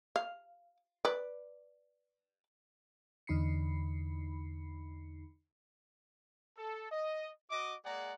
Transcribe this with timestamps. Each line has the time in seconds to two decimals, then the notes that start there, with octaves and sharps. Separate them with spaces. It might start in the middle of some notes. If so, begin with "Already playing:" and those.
0.16 F5
1.05 B4 D5
3.27 E2 D3 D#4 B5 C7 C#7
6.57 A4
6.90 D#5
7.50 F#4 D#5 D6
7.84 G#3 A#3 G#4 D5 F#5 A#5